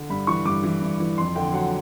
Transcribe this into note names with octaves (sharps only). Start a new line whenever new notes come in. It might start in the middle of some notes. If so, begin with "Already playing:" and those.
Already playing: D3
G2 B5
E3 C#6
G2 D6
E3
G2
E3
F2 C6
D3 G5
F#3 F#5